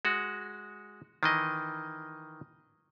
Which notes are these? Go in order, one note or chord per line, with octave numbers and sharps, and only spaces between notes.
G#3 F#4
D#3 E3 D#5